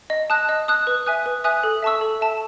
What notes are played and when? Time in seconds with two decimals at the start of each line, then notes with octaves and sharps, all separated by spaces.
0.10 D#5
0.30 A5 D#6 F#6
0.49 D#5
0.68 A5 D#6 F#6
0.87 B4
1.06 E5 G#5 D#6 F#6
1.26 B4
1.44 E5 G#5 D#6 F#6
1.63 A4
1.83 E5 A5 C#6 E6
2.01 A4
2.21 E5 A5 C#6 E6